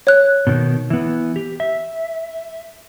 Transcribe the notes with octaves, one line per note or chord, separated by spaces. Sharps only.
C#5 F#6
B2 D#3
E3 B3
G4
E5